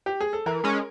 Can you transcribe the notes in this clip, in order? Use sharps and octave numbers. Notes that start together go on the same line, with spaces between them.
G4
G#4
A4
E3 A#4
G#3 C#4